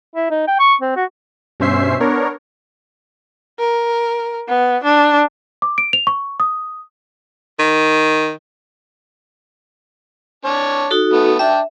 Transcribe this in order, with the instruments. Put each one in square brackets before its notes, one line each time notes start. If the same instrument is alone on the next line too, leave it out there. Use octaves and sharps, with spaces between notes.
[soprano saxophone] E4
D#4
G5
C#6
C4
F#4
[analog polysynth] G2 B2 C#4 C5 E5 C7
B3 D4 A#4 C#5
[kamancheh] A#4
B3
D4
[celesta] D6
D7
F7
C#6
D#6
[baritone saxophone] D#3
[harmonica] D4 C#5
[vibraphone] D#4 F#4 A4
[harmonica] A3 B3
[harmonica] D4 G5 [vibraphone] E5